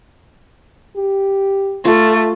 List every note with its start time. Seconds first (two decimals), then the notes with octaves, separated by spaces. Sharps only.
0.97 G4
1.85 A3 F4